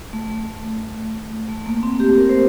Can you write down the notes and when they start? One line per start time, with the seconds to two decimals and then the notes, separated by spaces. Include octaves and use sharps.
0.13 A3
1.49 A3
1.66 A#3
1.83 C4
2.00 G4
2.18 A#4
2.29 C5